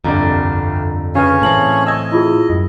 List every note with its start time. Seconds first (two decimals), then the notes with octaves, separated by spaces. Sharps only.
0.04 G1 C2 F2 D3 D4 D5 A#5
1.15 C#3 C#4 B4 C#5
1.42 A2 E3 C4 A5 F#7
1.87 D#5 E6 G#6
2.12 E4 F4 G#4
2.50 F#2